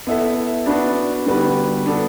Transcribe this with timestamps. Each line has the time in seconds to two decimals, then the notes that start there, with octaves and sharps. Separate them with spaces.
0.07 B3 E4 A4 E5
0.66 B3 D4 F#4 B4 D5
1.26 D3 G3 B3 F#4 B4
1.86 B3 D4 A4 D5